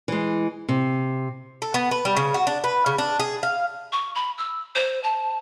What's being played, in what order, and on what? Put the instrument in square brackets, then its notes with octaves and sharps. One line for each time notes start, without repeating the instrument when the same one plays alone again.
[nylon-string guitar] E3 G#3
C3
[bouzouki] A4
B3
B4
G3
C#3
F#4
D4
B4
C#3
D4
G#4
F5
[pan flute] C#6
B5
E6
C5
A5